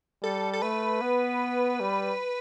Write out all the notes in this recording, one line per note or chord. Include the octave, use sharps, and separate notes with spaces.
G3 A4
A4
A3 B4
B3
G3